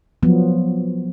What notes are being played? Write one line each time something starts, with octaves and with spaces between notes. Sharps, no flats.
F3 F#3 B3